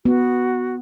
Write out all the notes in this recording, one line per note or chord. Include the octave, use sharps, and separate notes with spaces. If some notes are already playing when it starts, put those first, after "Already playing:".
B3 F#4